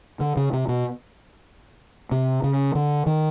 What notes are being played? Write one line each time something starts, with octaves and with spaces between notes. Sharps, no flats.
D3
C#3
C3
B2
C3
C#3
D3
D#3